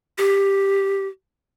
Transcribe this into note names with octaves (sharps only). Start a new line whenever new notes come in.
G4